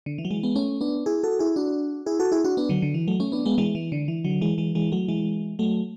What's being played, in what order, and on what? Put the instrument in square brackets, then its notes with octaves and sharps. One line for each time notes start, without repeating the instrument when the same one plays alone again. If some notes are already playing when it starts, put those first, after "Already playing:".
[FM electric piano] D3
E3
F#3
E3 G#3
G#3 B3
A3 C#4
B3 D4
E4 G#4
F#4 A4
E4 G#4
D4 F#4
E4 G#4
F#4 A4
E4 G#4
D4 F#4
B3 D4
D3 F#3
D3
E3
F#3 A3
A3 C#4
B3 D4
G#3 B3
E3 G#3
E3
D3
E3
D3 F#3
E3 G#3
E3 G#3
E3 G#3
F#3 A3
E3 G#3
F#3 A3